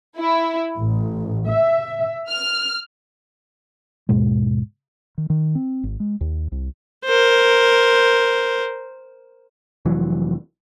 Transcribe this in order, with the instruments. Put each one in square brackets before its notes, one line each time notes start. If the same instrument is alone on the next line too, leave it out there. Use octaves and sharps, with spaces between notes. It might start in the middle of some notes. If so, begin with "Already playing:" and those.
[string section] E4
A1
E5
F6
[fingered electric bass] D#2 G#2 B2 G#3
D#3
D#3
C4
G#1
G#3
D#2
C2
[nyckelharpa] A#4 C5
[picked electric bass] F1 E3 F#3